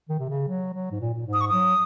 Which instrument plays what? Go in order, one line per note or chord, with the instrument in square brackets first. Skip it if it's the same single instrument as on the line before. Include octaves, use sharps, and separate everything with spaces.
[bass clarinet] D#3
C3
C#3
F#3
F#3
G#2
A#2
A#2
G#2
[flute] D#6
C#6
[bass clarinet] F#3 [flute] D#6